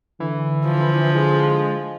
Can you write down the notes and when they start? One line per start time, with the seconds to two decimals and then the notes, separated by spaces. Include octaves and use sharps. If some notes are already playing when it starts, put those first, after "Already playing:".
0.20 D3 E3
0.65 F3
1.15 G#3